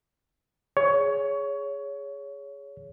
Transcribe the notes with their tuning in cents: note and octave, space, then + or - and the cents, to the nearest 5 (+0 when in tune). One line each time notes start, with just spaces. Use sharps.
G#4 +0 C#5 +20